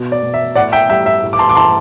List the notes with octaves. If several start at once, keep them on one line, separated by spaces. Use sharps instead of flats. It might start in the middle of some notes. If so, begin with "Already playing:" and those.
Already playing: B2
D5
B2
E5
A2 D5 F#5
E5 G5
G3 E5 G5
E5
A2
D6
A5 C6
D6
A2 A5 C6